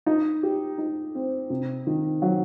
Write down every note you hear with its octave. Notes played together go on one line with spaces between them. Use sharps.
D#4
G4
D#4
C4
C3
D#3
F#3